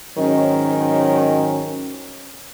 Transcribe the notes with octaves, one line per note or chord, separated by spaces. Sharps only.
G#2 D#3 F#3 C#4